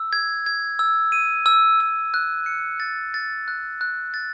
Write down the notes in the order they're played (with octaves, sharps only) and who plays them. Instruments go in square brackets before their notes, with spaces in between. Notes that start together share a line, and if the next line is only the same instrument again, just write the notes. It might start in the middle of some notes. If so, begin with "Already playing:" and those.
Already playing: [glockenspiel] E6
G#6
G#6
E6
D#7
E6
E6
F#6
C#7
A6
A6
F#6
F#6
A6